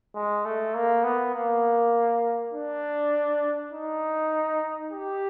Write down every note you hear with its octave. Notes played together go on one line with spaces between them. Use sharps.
G#3
A3
A#3
B3
A#3
D4
D#4
G4